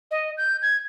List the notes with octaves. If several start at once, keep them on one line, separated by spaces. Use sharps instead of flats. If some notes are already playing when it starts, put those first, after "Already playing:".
D#5
G6
G#6